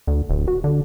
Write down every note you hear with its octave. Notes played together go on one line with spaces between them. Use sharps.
D2
D1
F#4
D3